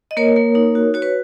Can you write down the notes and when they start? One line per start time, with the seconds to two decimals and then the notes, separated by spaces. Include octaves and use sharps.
0.11 D#5
0.17 A#3 A#4 C#5
0.36 A#3
0.55 D#4
0.75 F#4
0.94 F#4 C#5
1.02 B4